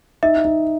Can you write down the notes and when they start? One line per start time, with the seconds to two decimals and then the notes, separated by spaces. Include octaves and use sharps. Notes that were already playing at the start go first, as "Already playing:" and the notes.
0.23 D#4 E5
0.45 D#4